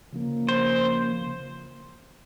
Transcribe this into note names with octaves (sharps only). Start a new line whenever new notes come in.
C#3 F3 A#3
C5